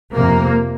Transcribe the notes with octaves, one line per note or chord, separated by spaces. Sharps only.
F2 C3 A#3